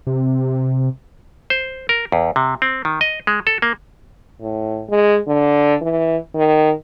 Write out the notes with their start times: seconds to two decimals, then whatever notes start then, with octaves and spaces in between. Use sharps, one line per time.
0.07 C3
1.50 C5
1.89 A#4
2.12 E2
2.36 C3
2.62 C4
2.85 D#3
3.01 D#5
3.27 G#3
3.47 A4
3.62 A#3
4.42 A2
4.90 G#3
5.28 D3
5.82 E3
6.35 D#3